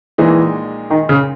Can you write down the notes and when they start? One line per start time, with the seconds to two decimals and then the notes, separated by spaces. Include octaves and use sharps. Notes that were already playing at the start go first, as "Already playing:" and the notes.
0.18 A#1 A#2 E3 G#3 D#4 G#4
0.90 D#3
1.09 C#3